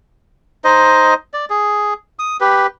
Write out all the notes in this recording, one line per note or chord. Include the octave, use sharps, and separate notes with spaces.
D#4 C5 D#5
D5
G#4
D#6
G4 B4